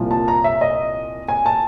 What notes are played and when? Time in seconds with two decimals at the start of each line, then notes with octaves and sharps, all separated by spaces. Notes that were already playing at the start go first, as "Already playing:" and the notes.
Already playing: C2 A#2 F3
0.11 A5
0.28 A#5
0.44 E5
0.61 D#5
1.28 G#5
1.46 A5